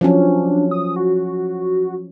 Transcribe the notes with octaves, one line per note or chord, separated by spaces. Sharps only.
F3 F#3 C#4 D4
D#6
F#4